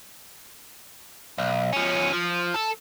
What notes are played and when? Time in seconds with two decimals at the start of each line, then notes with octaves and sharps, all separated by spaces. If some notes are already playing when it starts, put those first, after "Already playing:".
1.38 B1
1.73 F3 C#4
2.13 F3
2.56 A4